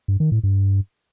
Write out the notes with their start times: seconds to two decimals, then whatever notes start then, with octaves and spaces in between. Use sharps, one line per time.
0.08 G2
0.20 D#3
0.32 A2
0.44 G2